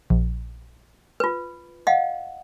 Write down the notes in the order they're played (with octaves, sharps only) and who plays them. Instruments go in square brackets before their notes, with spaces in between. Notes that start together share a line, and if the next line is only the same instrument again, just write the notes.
[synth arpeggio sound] A#1
[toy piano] F4 B4
D#5 F5 F#5